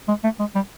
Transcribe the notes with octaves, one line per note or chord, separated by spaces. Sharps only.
G#3
A3
G#3
G3